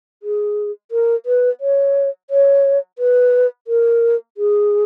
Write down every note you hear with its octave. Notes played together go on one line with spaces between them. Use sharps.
G#4
A#4
B4
C#5
C#5
B4
A#4
G#4